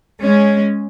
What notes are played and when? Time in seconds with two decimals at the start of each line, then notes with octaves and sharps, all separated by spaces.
0.22 G#3 C#4